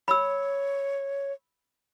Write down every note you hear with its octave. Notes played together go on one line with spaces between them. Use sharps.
C#5 B5 E6